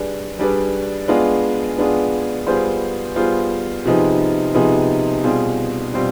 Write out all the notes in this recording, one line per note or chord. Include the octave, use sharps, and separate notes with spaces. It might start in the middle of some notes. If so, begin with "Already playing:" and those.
Already playing: G3 D4 G#4 B4 D5
G3 D4 G#4 B4 D5
G#3 B3 D4 F4 G#4
G#3 B3 D4 F4 G#4
G3 B3 F4 G#4 C5
G3 B3 F4 G#4 C5
C3 F3 B3 D#4 G#4
C3 F3 B3 D#4 G#4
B2 G3 C4 F4 G#4
B2 G3 C4 F4